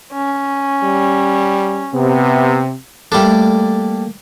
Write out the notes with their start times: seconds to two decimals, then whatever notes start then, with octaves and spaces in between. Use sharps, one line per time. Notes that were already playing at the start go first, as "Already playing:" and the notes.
0.13 C#4
0.84 G3
1.94 C3 B3
3.12 G3 A3 A#3 D4 A4